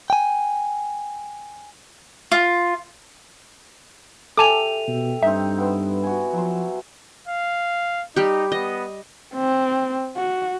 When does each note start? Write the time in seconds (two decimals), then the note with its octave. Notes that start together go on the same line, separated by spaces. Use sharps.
0.10 G5 G#5
2.32 F4
4.37 G4 A4 E5 G#5 A5 D6 D#7 F7
4.88 B2
5.23 G2 C4 D#4 E5
5.58 B3 E4 C5
6.03 F#4 G#5
6.33 F3 F#3 C5
7.27 F5
8.16 G3 D#4 G4
8.52 B3 D#5
9.35 C4
10.17 F#4